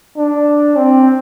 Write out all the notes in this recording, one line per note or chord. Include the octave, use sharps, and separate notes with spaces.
D4
C4